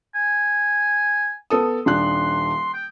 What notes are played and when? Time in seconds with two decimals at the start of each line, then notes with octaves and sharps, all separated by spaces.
0.15 G#5
1.50 B3 A4 D#6
1.86 D#1 D4 C6 F#6
2.74 G5